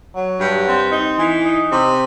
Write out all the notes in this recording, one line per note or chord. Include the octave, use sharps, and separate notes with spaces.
F#3
G2
C4
D#4
E3
D#4
C3